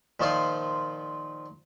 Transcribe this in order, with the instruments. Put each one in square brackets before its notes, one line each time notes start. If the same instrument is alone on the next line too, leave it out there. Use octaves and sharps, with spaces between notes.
[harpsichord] A#2 D#3 F3 F4 C5 C6